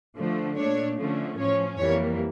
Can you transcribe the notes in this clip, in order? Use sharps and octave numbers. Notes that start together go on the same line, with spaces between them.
D3 F3 A3
A#2 A3 D4 C#5
D3 F3 A3 C#4
A2 F3 C#4 C#5
F2 E3 G3 A#3 C#5